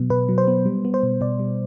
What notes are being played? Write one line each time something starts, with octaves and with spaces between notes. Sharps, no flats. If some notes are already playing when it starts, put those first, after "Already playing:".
Already playing: B2 F#3 B3
B2 B4
F#3
C5
B3
G3
B3
C5
B2
B2 D5
G3